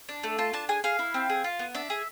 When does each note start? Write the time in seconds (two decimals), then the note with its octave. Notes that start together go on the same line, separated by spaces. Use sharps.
0.09 D4
0.23 A3
0.38 F4 A5
0.53 D4 A5
0.69 G#4 G#5
0.84 G#4 F5
0.99 E4
1.14 C4
1.29 G#4
1.44 F4
1.59 B3
1.75 D4 E5
1.90 G#4